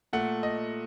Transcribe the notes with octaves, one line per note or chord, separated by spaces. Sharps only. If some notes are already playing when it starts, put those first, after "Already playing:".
A#2 A3 F#5
D#5